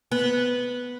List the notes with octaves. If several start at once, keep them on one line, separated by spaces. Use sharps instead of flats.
B3